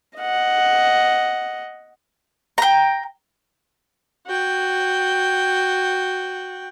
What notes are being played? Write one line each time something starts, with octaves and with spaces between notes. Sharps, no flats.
D#5 F#5
G5 A#5
F#4 G5